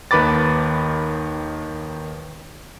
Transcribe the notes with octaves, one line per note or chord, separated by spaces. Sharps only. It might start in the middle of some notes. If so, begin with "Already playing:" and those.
D#2 D#3 B4 B5 D6 A6